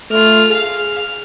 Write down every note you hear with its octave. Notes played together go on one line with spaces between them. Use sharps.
A3 F4 F6
G#4 F5 F6